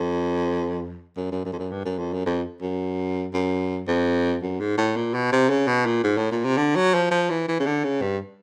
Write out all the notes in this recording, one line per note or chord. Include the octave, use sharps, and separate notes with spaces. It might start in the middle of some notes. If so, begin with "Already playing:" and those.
Already playing: F2
F#2
F#2
F#2
F2
F#2
G2
F#2
F2
F#2
F2
F#2
F#2
F2
F#2
G#2
A2
A#2
B2
C3
C#3
B2
A#2
G#2
A2
A#2
C3
D3
F#3
F3
F3
E3
E3
C#3
D3
C#3
G2